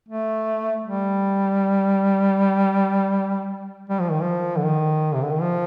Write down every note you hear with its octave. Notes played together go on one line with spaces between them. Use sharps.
A3
G3
G3
F3
D#3
F3
D3
D#3
C3
D3
D#3
F3